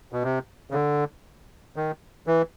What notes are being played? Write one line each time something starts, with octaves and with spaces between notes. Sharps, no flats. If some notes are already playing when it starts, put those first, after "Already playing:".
B2
C3
C#3
D3
D#3
E3